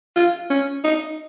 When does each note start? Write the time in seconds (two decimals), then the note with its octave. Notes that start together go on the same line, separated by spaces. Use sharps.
0.16 F4
0.50 C#4
0.84 D#4